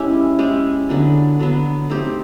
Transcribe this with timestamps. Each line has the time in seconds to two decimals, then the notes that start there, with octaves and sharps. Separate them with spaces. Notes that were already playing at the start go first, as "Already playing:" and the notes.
Already playing: G#3 C#4 E4 G4
0.39 G#3 C#4 E4 G4
0.89 D3 F#3 B3
1.39 D3 F#3 B3
1.90 A3 C4 D#4 G4